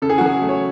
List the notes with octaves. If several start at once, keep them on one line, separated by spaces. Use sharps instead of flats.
C#3 A4
G#4
F#4
F#3 G#4
A3
C#5